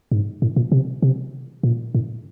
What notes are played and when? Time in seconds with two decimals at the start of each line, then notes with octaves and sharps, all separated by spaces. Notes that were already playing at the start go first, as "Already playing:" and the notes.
0.12 G#2
0.42 A2
0.56 A#2
0.72 C3
1.02 C3
1.63 A#2
1.95 A2